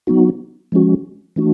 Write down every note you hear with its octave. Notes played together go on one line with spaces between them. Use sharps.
F#3 B3 D#4 F#4
F3 G#3 C#4 F#4
E3 A3 D4 F#4